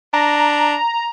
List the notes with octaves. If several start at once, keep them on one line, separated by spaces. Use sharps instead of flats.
D4 A#5